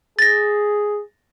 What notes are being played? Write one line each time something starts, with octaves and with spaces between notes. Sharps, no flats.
G#4 A6 A#6